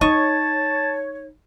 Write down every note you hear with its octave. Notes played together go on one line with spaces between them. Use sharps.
D#4 C#5 D#5 A5 C#6